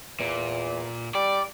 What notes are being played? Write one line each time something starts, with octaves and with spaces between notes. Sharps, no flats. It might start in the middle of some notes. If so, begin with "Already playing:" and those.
E2 A#2
G3 D5